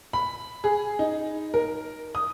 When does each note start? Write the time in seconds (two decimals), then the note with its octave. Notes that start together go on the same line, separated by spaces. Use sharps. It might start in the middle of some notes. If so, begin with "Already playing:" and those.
0.13 B5
0.64 G#4
0.99 D#4
1.54 A#4
2.15 D#6